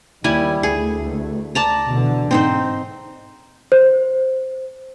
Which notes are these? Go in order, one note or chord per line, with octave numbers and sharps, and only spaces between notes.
D#2 G3 E4 G#5
D2 A3 G#4
D5 A5 A#5
B2 D3 E3
G#2 C4 D#4 C5
C5